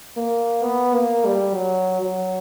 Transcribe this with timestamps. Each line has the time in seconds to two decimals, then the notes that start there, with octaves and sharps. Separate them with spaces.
0.17 A#3
0.63 B3
0.95 A#3
1.26 G3
1.55 F#3
2.02 F#3